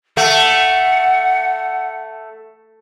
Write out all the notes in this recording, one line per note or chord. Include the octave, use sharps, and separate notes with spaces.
A3 F#5